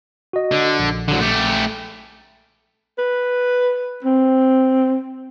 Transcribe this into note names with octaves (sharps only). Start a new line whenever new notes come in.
F#4 D#5
D3
A#1
D3 F#3
A3 G4
B4
C4